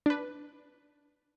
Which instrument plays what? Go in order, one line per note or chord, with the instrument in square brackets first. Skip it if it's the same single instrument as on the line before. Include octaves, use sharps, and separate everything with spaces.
[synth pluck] D4 B4